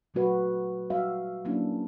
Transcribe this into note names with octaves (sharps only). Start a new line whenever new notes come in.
A#2 F#3 A3 F#4 B4
G3 F#4 E5 F5
F#3 A#3 C#4 D4 E4